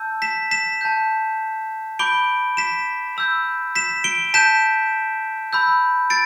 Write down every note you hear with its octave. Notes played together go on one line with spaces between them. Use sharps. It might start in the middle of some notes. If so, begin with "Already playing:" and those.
Already playing: A5 E6 G6
B6 E7
B6 E7
A5 G6
B5 D6 G6 D7 G7
B6 E7
B5 E6 G6
B6 E7
D7 G7
A5 G6 B6 E7
B5 E6 G6
A6 D7